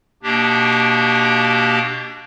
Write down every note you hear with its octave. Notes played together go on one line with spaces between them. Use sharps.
B2 A#3 D4 G4